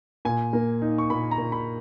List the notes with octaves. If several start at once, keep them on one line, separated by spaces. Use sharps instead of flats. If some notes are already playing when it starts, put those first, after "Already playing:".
A#2 G#5
A#3
D#4
C#6
A#2 B5
A#5
A#2
B5